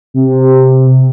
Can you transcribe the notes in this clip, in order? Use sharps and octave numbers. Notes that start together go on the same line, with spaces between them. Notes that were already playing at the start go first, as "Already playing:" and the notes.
C3